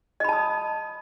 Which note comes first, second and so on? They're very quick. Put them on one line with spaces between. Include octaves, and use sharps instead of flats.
D#5 B5 A5 D#6